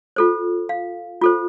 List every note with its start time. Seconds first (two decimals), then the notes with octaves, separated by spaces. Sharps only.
0.16 F4 A4 C5
0.69 F5
1.21 F4 A4 C5